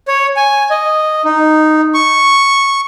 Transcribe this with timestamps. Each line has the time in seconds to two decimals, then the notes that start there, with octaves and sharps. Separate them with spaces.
0.08 C#5
0.37 G#5
0.71 D#5
1.25 D#4
1.94 C#6